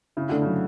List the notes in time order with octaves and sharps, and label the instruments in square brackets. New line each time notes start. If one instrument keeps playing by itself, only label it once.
[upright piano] C#3 [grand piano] E4
[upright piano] D3 [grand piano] A3
[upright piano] C#3 [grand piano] F#3